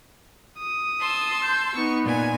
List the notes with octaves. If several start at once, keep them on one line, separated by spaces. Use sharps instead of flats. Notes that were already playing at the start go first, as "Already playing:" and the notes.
D#6
A5 C6 E6
G6
B3 D#4 C#6
A#2 G#5